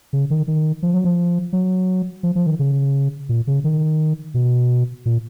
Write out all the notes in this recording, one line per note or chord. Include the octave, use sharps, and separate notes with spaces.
C#3
D#3
D#3
F3
F#3
F3
F#3
F3
F3
D#3
C#3
A#2
C#3
D#3
B2
A#2